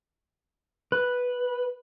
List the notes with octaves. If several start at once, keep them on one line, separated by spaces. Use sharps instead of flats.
B4